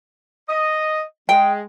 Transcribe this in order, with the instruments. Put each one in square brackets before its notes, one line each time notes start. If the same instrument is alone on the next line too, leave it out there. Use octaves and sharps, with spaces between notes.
[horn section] D#5
[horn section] G#3 [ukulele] G5